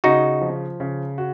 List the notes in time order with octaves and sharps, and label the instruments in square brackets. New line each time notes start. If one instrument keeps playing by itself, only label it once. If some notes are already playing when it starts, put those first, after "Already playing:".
[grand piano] C#3 [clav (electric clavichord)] D#4 F#4
[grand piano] F3
C#3
F#4